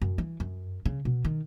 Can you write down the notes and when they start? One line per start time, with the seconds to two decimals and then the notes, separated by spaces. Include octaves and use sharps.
0.02 F#2
0.18 E3
0.40 F#2
0.86 C#3
1.05 B2
1.25 D#3